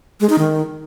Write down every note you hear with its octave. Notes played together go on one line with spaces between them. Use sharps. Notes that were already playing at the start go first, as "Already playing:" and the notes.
G#3
D#4
D#3